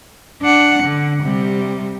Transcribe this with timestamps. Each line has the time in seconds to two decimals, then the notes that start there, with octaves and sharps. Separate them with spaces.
0.42 D4 F#5
0.83 D3
1.23 C3 G3